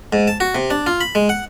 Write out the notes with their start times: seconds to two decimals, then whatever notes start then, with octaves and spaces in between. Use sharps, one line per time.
0.13 G#2
0.28 A5
0.40 F#4
0.55 C3
0.70 D4
0.87 F4
1.01 B5
1.15 G#3
1.29 F#5